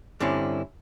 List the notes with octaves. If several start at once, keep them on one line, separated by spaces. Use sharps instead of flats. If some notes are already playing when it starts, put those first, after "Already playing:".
G2 D3 C4 C#4 E4